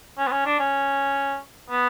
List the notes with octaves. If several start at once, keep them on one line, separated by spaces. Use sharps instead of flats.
C#4
B3
C#4
D4
C#4
B3